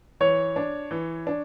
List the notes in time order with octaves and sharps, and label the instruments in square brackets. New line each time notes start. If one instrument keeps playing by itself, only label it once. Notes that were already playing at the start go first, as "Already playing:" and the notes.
[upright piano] E3 [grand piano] C#5
[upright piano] D4
E3
D4